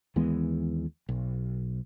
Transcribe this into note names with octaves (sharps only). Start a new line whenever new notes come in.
D#2 E3 G#3 B3
B1